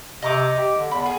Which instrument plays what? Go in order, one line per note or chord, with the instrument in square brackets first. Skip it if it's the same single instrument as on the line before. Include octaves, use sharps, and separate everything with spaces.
[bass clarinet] C3 [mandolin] D#5 A#5 D6
[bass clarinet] G4
D3
[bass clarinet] E2 [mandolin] B5
[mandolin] G#4